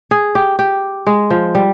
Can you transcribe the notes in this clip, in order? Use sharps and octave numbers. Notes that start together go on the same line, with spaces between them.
G#4
G4
G4
G#3
F3
G3